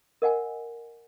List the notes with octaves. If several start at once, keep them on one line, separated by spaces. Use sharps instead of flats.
A#4 D#5 F#5 G#5